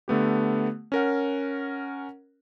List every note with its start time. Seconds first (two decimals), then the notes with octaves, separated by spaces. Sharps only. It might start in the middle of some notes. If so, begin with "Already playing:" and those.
0.08 D3 A3 B3 G4
0.92 C#4 A#4 F#5